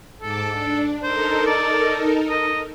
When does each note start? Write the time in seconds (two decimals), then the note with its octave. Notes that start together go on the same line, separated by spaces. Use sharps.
0.21 G#2 A4 A5 D6
0.51 D4
1.03 D#4 A4 A#4 C5
1.46 D5
2.30 D#5